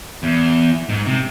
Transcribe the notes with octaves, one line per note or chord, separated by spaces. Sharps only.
E2
G#2
C3